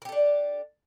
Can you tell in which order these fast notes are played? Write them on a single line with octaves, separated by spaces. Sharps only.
A#4 G4 A4 D4